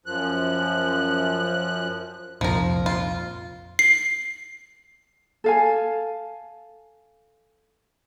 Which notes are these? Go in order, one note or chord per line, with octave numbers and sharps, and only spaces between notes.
F#2 F3 F#6
C2 F2 A#2 F3 A#4
F4
C7
A4 F5 G#5